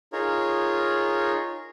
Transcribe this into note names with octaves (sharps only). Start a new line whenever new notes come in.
D#4 F4 G#4 A#4 C#5